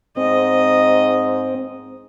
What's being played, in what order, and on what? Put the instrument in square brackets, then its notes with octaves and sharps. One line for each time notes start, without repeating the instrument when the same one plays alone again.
[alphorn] G#2 [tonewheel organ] C4 [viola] D#5